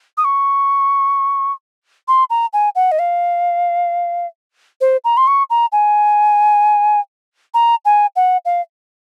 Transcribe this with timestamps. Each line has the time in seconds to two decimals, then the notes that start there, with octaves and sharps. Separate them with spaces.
0.17 D#6
0.25 C#6
2.08 C6
2.30 A#5
2.53 G#5
2.75 F#5
2.92 D#5
2.99 F5
4.81 C5
5.04 A#5
5.17 C6
5.27 C#6
5.50 A#5
5.72 G#5
7.54 A#5
7.85 G#5
8.16 F#5
8.45 F5